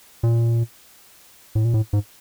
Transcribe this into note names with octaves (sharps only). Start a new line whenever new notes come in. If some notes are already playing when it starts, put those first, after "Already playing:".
A#2
A2
A#2
A2
G#2